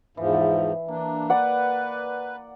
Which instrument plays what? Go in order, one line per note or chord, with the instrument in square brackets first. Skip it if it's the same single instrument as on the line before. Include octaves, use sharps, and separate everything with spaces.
[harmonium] E2 G#2 F3 [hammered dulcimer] E3
[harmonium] E3 D4 [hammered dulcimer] A#3
[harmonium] B4 [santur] D5 F#5